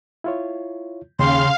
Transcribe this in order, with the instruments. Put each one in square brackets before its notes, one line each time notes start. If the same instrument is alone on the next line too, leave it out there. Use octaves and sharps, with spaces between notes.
[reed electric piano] E4 F4 C#5
[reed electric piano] D#2 G5 [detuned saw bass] C#3 [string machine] F5 [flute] C6